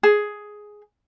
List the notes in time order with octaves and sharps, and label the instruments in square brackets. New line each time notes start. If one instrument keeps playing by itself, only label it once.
[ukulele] G#4